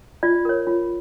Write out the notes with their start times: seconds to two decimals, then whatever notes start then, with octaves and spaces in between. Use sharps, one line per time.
0.23 F4 D5
0.45 A#4 C#5
0.67 F4